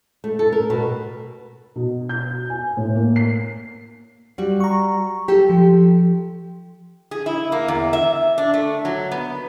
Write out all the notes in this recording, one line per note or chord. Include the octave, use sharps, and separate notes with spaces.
A3
A4
A#4
B2
B2
G6
G#5
A2
A#3
C7
G3 F#4
A#5 C#6
G4 A4
F3
G#4
E4
A#3
E2
E5
D4
A3
F#3
B3